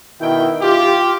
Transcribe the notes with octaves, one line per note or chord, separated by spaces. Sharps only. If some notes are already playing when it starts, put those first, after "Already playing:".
B2 D#3 E4 G5
F4 G4